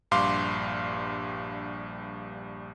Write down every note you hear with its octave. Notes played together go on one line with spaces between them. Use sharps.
A#1 G2 F5 C6 D6